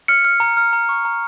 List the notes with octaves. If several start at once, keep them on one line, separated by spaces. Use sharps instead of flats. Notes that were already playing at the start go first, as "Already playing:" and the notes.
F6 C#7
F6
A#5
F6
A#5
C#6
A#5